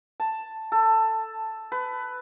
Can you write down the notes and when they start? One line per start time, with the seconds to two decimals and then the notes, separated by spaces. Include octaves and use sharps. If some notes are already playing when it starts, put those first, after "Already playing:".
0.20 A5
0.72 A4
1.72 B4